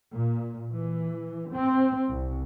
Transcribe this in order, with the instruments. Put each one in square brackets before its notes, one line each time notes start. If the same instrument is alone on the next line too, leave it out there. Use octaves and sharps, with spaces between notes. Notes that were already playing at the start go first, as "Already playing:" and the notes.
[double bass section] A#2
E3
C4
C2